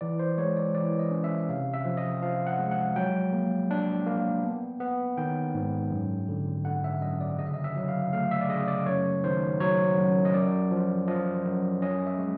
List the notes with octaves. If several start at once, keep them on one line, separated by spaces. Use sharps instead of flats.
E3 D5
C5
G#3 C#5
D5
E3 D5
D#5
C#4
E5
C3 F5
E5
F3
D#5
F3 F5
F#5
G#3
F#5
F#3 G5
A#3
D4
A#3
B3
B3
D#3 G5
G#2
F#2
D3
D3 F#5
E5
F#2 D#5
D5
C#3 D#5
E5
D#5
E5
F#3
F5
A3 F5
E5
D5
C#3 D#5
D5
F#2 C#5
D#3 C5
F#3 C#5
F#2
D#5
F#2 D5
F3
F3 D#5
F#2
C#4 D#5
E5
G#3